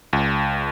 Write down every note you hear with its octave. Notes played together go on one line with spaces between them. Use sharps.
C#2